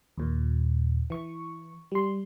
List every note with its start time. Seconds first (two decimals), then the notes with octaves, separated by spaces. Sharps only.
0.17 D#2 A#2
1.10 E3 C#6
1.92 G3 C6